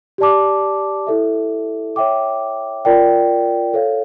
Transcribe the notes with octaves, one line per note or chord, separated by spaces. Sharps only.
G4 D5 A5 D6
E4 A4 E5
C#5 E5 G5 D6
F4 A#4 D5 G5
A4 C#5 F5